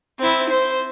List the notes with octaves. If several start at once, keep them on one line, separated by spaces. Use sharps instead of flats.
C4 E4
C5